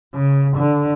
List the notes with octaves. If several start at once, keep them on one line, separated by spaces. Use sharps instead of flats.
C#3
D3